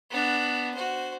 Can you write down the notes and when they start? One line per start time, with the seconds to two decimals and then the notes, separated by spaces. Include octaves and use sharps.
0.11 B3 D4
0.74 F#4 C5